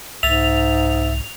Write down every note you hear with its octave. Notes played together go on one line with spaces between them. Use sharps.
C2 G#2 E5 A6 F7